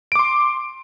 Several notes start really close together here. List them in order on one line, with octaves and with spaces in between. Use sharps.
D7 D6 C6